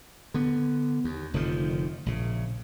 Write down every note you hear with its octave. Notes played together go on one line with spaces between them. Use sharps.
D3 B3
D#2
F1 D3 D#3 F3
A#1 C#3